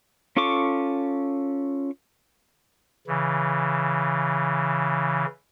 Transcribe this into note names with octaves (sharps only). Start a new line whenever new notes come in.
C#4 F4 A4 C#6 D6
C#3 E3